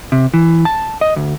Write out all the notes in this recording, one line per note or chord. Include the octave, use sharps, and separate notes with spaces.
C3
E3
A5
D#5
D2